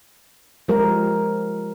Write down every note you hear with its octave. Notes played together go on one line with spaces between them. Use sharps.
F3 G#3 G4 A#4